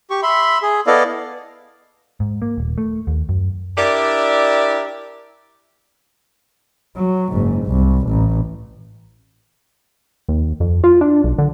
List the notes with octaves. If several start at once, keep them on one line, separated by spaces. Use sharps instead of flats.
G4 C#6
E5 B5 C6
G#4
B3 E4 A4 D5 D#5 F5
G#2
A#3
D#1
A3
D#2
F#2
D4 E4 G4 A#4 D5
F#3
F#1 G#2
C2
A1
D#2
F2
F4
D4
B1
D3